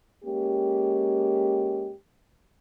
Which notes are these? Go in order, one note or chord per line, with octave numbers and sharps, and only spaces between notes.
G#3 A#3 C#4 G4